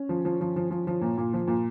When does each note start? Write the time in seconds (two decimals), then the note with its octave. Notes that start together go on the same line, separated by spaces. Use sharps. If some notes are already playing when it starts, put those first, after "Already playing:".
Already playing: C#4
0.09 F3
0.25 F3
0.41 F3
0.56 F3
0.71 F3
0.87 F3
1.01 A#2
1.18 A#2
1.33 F3
1.47 A#2